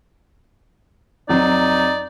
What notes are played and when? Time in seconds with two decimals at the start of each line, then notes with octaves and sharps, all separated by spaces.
1.29 F2 F#3 D#4 D5